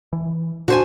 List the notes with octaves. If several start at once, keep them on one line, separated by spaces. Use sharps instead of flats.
E3
A#2 D4 F#4 C5 G#5